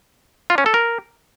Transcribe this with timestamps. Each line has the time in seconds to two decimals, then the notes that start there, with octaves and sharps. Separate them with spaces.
0.50 F4
0.58 C#4
0.66 A4
0.74 A#4